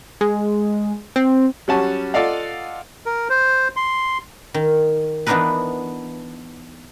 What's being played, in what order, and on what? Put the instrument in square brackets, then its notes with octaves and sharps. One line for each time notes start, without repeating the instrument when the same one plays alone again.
[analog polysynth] G#3
C4
[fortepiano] F#3 G3 C#4 F#5 A5
F4 A4 D5 D#5 F5 F#5
[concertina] A#4
C5
C6
[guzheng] D#3
E3 B3 D4 D#4 A#4 B4